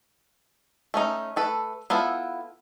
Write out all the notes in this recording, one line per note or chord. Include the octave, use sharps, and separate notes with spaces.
A3 C#4 D#4
A3 A4 B4
B3 E4 F4 A4